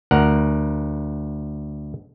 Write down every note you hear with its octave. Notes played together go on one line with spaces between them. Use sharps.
D2 A#4 F#5